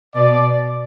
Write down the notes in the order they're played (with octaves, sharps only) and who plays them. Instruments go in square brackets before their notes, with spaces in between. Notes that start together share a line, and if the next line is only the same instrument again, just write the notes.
[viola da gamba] B2 [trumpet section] D5